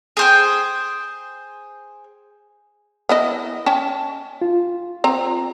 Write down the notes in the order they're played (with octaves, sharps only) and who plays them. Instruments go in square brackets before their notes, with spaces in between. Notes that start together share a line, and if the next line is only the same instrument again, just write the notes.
[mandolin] G#4 C5 G5
[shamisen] B3 E4 D#5
C#4 G5 A5
[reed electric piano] F4
[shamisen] C4 A#5